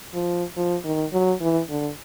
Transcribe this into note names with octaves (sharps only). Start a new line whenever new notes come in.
F3
F3
D#3
F#3
E3
D3